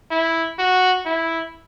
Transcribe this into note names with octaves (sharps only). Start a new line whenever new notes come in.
E4
F#4
E4